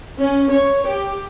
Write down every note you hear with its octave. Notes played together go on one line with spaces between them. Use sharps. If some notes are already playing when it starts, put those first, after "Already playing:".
C#4
C#5
G4